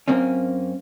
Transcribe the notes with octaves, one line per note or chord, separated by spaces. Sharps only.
F#2 A#3 C4 C#4